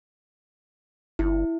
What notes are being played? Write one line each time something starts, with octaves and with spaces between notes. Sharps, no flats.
G1 E4